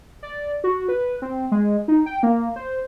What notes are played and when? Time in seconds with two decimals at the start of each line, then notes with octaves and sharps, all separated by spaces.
0.23 D5
0.64 F#4
0.89 B4
1.22 C4
1.52 G#3
1.88 D#4
2.06 G5
2.23 A#3
2.56 C5